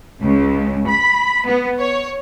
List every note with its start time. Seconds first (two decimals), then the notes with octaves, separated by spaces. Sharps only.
0.21 C#2
0.87 B5
1.46 B3
1.80 C#5